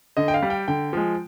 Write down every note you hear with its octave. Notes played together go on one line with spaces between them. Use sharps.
D3 D#5
G5
F5
G3
G5
D3 G5
F3 G#3